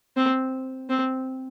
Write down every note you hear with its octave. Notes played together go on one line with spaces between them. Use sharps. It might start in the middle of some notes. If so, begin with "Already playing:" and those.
C4
C4